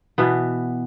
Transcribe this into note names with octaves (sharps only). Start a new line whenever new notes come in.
B2 E3 B3